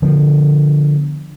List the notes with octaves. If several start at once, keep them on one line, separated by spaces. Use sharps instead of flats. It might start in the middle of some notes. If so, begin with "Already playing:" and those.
D3 F3 B3